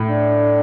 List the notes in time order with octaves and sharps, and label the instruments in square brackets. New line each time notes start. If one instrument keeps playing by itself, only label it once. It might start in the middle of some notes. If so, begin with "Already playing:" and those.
Already playing: [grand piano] A2
[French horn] D4